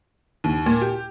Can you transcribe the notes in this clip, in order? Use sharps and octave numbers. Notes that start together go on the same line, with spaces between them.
D#2
A#2
G4